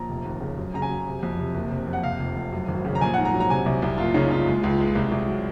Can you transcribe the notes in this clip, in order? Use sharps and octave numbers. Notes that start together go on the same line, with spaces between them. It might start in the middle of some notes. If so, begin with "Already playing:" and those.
Already playing: A#1 A#5
F1
D#2
C#3
F#2
C#3 A#5
G#5
F#3
C3
F2
C3
F#1
C3
F2
F#5
C3 F5
F1
F1
F#2
G#1
C#3
A#5
A#1 G#5
G#2 F#5
A#5
F#3
A#5
C3 G#5
C2
C2
F#1 F4
C#3 D#4
C#3 F4
G#3
C#2
G#3
C2
C2
F#3